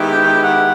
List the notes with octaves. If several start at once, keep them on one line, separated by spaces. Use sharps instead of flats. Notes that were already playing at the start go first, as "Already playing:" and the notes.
Already playing: D#3 G#3 B3 E4 G4
G5
F#5